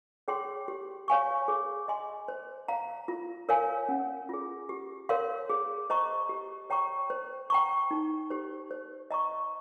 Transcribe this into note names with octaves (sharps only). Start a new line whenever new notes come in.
G#4 C#5 G5 C6
G4
C#5 F5 G#5 C#6
G#4
D#5 G#5 C6
C5
F5 A#5
F4
A#4 C#5 F5 G#5
C#4
F4 G#4
G4
A#4 C#5 F5 C6
G#4
C5 D#5 A#5 C#6
G4
C#5 G5 A#5 C#6
C5
G5 A#5 C#6
D#4
G4 C5
C5
D#5 A#5 C#6